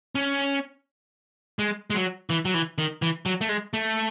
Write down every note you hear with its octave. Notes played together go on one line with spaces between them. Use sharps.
C#4
G#3
G#3
F#3
E3
F#3
E3
D#3
E3
F#3
A3
G#3
A3